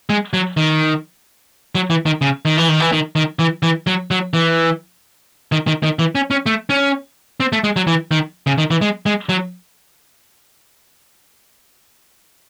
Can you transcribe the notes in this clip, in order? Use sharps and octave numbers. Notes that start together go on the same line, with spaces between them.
G#3
F#3
D#3
F#3
E3
D#3
C#3
D#3
E3
D#3
E3
D#3
D#3
E3
E3
F#3
F#3
E3
D#3
D#3
D#3
E3
C#4
C#4
A3
C#4
C4
A3
G#3
F#3
E3
D#3
C#3
D#3
E3
G#3
G#3
F#3